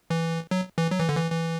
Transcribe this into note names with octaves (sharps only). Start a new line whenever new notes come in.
E3
F#3
E3
F#3
E3
D3
E3
E3